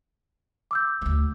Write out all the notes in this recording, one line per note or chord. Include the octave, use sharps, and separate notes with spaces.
D6 E6 G6
D2 A3